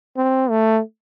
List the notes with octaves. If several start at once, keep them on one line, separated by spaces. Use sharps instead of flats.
C4
A3